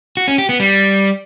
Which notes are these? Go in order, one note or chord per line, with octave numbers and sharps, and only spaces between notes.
F#4
C#4
G4
B3
G3